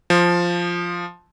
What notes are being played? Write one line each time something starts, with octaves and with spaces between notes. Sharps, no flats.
F3